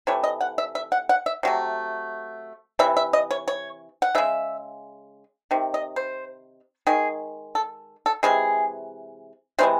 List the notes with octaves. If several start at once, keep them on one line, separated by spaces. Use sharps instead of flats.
C3 E3 A3 C#5
D#5
F#5
E5
E5
F#5
F#5
E5
C3 F#3 A3
C3 E3 E5
E5
D#5
C#5
C#5
F#5
C#3 G#3 E5
C3 D#3
D#5
C5
D#3 G#3 G#4
A4
A4
C3 E3 G#3 G#4
C3 E3 G#3 C5